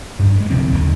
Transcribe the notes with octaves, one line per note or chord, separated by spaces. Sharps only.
G2 G3
G3 G#3
D2 C3 F3 C4
F#1 D#2 D3 D#3